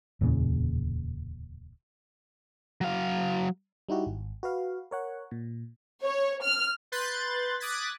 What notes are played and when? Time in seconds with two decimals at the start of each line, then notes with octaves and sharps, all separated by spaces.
0.21 D1 E2 A#2 C#3
2.81 F#3 F5
3.89 G3 D#4 E4 F#4 G4
4.06 G#1
4.43 F#4 B4 F5
4.91 A#4 C#5 F#5
5.31 A#2
6.04 C#5
6.44 F6
6.92 B4 C6 F#6 G6 A6
7.60 D6 D#6 F#6 G#6 A6 B6